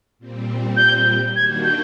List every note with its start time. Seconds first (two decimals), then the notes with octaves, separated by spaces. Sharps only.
0.19 A#2 G3 C4
0.77 G6
1.36 D#3 G3 A#3 D4 F#4 G#6
1.64 G6